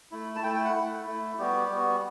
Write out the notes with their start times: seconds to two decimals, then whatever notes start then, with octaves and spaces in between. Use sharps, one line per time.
0.12 A3 E4
0.36 A5
0.43 A3 E4 G5
0.54 G5
0.65 F#5
0.75 A3 E4
1.07 A3 E4
1.39 G3 B3 F#4 G4
1.71 G3 B3 F#4